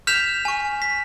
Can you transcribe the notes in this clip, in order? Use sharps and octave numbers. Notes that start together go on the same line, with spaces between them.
F6 G6 B6 E7 F7
G#5 C#6
B6